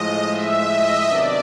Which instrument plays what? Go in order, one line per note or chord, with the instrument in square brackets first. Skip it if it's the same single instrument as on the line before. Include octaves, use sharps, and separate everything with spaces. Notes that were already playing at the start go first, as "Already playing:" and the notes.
Already playing: [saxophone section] A2 F3 G#3 [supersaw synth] D#5
[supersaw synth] E5
D#5
[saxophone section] C3 D#3 F#3 B3 D4 [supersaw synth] D5